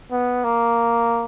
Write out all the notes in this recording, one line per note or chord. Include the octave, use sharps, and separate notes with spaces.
B3
A#3